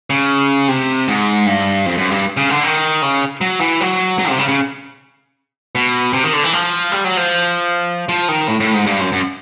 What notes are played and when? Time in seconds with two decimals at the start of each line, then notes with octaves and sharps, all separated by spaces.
0.10 C#3
0.68 C3
1.08 G#2
1.46 G2
1.86 F2
1.98 F#2
2.11 G2
2.37 C#3
2.49 D3
2.63 D#3
3.02 C#3
3.41 F#3
3.60 E3
3.81 F#3
4.19 F#3
4.29 C3
4.38 C#3
4.49 C#3
5.75 B2
6.13 C3
6.23 D#3
6.33 D3
6.43 E3
6.53 F3
6.92 G3
7.04 F#3
7.17 F3
8.09 F3
8.28 D#3
8.48 A2
8.60 A2
8.74 G#2
8.86 G2
9.00 F#2
9.12 F#2